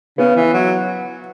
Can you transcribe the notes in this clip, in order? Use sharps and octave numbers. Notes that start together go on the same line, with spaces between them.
C#3 B3
E3
F#3